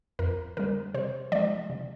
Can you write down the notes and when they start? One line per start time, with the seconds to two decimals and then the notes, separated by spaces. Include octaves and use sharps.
0.19 F2 A#4
0.57 D3 G3 A#4
0.94 C3 C5
1.32 F3 G#3 D5
1.70 C3